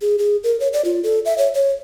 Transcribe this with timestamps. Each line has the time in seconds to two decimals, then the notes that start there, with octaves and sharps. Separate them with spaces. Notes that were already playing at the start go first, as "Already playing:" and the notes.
0.01 G#4
0.18 G#4
0.44 A#4
0.60 C#5
0.73 D5
0.85 F4
1.04 A4
1.25 E5
1.38 C#5
1.54 C#5